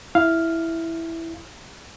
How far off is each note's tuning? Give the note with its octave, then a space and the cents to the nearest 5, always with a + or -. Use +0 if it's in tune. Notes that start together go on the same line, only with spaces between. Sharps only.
E4 +0 F5 +0